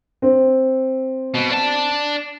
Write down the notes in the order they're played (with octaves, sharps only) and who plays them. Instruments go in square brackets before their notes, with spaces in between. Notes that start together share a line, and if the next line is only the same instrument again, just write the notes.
[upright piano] C4
[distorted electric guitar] B2
D4 A5